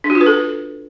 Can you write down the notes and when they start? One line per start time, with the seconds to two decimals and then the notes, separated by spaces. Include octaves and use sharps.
0.04 D4
0.10 F#4
0.15 F4
0.21 B4
0.26 A4